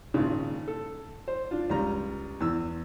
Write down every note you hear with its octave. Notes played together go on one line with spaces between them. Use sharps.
G#1 A#2 C#3
A4
C5
D4 F4
C#2 G3 A#5
E2 E6